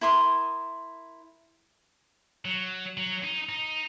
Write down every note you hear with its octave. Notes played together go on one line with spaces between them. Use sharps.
E4 A#4 C6 D#6
F#3
F#3
D#4
D#4